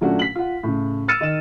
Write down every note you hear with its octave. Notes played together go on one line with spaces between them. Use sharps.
A#2 F#3 A3 C#4 D4 F#4
B6 F#7
F4 F#5
A2 C#3
E6 F6 A6 C#7 D#7 E7
D#3 D#4 E7